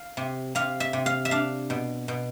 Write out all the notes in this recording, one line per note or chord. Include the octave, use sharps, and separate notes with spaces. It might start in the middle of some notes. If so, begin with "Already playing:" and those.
Already playing: F5
C3
C3 F5
E5
C3
F5
E5
D4 F5
B2
B2